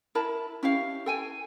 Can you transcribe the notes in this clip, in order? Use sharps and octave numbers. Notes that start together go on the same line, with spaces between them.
E4 A#4 A5 B5
C#4 E4 G4 F5
A4 G5 G#5